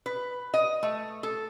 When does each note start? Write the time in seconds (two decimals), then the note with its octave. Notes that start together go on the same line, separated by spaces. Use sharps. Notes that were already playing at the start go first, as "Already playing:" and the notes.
0.06 B4
0.54 D#5
0.83 A3
1.23 A4